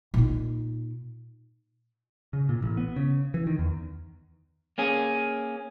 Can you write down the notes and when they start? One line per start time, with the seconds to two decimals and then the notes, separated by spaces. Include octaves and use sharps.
0.14 A#2 D#4
2.33 C#3
2.49 A#2
2.62 A1
2.77 B3
2.96 C#3
3.34 E3
3.47 D#3
3.59 E2
4.78 A#3 C#4 G#4